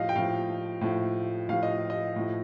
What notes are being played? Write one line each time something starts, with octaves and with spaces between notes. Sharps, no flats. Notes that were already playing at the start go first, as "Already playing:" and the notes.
Already playing: A2 F3 D#5 F5
G5
A2 F3 F5
A2 F3
A2 F3 F5
D#5
D#5
A2 F3